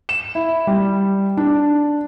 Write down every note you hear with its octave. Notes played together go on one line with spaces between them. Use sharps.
E7
E4
G3
D4